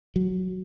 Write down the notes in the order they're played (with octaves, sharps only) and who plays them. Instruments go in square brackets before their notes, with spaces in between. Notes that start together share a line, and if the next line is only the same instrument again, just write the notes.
[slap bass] F#3